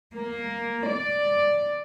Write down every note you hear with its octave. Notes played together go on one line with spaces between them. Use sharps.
A#3
D5